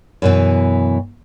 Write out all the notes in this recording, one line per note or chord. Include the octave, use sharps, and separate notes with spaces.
F#2 B2 E3